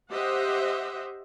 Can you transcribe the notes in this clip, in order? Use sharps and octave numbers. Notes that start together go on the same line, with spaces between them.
G4 C5 D#5 E5 F#5